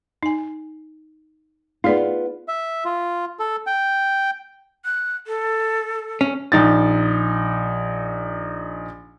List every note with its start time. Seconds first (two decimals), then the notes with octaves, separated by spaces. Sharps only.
0.23 D#4 G#5
1.84 B3 D#4 F4 G#4 D5
2.48 E5
2.85 F4
3.39 A4
3.67 G5
4.85 F#6
5.27 A4
6.21 C#4
6.52 A#1 D#4 A6